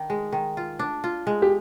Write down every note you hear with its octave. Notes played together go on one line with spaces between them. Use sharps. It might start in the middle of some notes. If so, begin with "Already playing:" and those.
Already playing: D#3 D4
G#3
D#3
F4
D4
F4
G#3
G4